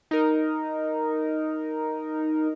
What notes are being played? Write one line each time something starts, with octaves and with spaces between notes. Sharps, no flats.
D#4 A#4